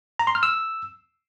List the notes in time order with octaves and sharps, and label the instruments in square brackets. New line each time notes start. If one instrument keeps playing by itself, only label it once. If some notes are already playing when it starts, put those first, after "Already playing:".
[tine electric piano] A#5
C6
F6
E6